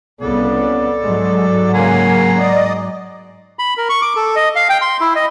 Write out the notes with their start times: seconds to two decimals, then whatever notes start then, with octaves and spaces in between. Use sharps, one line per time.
0.21 C2 C#3 B3 A4 D5
1.02 G#2 F#3 G#3
1.74 C#3 A#3 F#5 G#5 A#5 C6
2.39 D5 D#5
3.59 B5
3.77 A#4
3.89 C#6
4.02 D6
4.16 A4
4.36 D#5
4.56 F5
4.69 G5
4.82 C6
5.01 E4
5.15 D#5